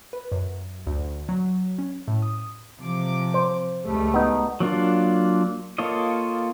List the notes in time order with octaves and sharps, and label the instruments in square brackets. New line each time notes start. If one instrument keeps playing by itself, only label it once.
[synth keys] B4
F#2
D2
F#3
C#4
A2
D#6
[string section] C3 F3 D6
[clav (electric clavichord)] C5
[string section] C#2 G3 A3
[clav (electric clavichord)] B3 D#4
[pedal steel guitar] F#3 A#3 D4 F4
A#3 F4 A4 C#5 D#5